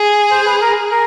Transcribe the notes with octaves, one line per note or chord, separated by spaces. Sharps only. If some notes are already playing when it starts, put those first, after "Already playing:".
Already playing: G#4
C5
B4
A#4
A#4